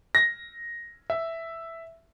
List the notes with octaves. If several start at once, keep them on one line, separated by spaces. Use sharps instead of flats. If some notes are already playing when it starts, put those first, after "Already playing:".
A#6
E5